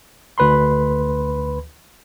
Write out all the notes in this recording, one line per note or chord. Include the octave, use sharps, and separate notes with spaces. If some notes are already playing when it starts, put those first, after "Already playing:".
D2 B4 B5 C6